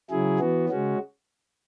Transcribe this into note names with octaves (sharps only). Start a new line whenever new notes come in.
C#3 F#3 E4 G#4
E3 B3 F#4
C#3 G#3 C#4 F#4